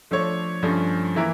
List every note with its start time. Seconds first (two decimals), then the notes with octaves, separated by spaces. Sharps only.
0.11 F3 A3 D4 A4 C#5
0.62 G2 F3 A3 C#4
1.16 E3 A#3 E4 A#4